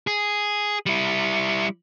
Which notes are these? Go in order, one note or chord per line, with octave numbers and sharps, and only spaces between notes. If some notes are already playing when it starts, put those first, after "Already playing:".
G#4
G3 E4